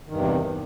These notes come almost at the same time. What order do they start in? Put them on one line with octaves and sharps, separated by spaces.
D#3 G2 E2 C3